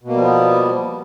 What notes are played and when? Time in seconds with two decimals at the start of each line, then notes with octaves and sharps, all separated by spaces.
0.03 B2
0.08 A#3
0.13 G3
0.17 F3
0.22 B3